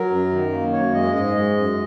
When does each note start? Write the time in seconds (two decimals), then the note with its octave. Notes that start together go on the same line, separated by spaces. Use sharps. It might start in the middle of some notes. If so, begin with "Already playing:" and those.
Already playing: F#3 A#4
0.10 F#2
0.31 D#3
0.52 A#3
0.73 F#2 C#5
0.94 G#3 D#5
1.15 G#2 D#5
1.36 G#3
1.57 F#2